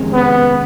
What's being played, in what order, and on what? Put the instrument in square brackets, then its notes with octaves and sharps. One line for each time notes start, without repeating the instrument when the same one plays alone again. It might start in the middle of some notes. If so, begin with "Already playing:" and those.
Already playing: [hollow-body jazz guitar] F2 C3 D#3 G#3 C#4
[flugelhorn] B3